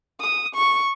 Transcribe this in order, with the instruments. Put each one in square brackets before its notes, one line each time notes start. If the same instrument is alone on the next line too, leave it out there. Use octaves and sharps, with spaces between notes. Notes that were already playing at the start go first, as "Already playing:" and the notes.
[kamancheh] D#6
C#6